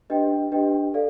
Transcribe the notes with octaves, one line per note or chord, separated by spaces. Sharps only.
D4 G4 B4 D#5 G5
D4 G4 B4 D#5 G5
A4 D5 F5